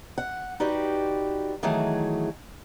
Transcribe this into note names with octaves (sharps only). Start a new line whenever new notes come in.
F#5
D#4 F#4 G4 B4 D5
D#3 E3 F#3 A3 G#4